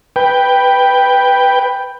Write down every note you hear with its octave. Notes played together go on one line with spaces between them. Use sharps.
B4 G5